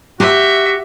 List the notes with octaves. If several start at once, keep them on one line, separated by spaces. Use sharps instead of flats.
F#4 G4 E5